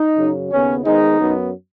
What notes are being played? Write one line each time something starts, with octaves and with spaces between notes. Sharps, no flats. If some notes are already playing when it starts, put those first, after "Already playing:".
Already playing: D#4
F#2 C#3 F#3
D#2 C#3 B3 C#4
G#2 D#3 G#3 B3 D#4
F#2 F#3 B3